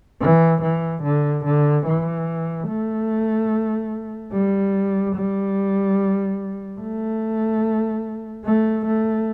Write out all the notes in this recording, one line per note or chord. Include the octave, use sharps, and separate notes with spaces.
E3
E3
D3
D3
E3
A3
G3
G3
A3
A3
A3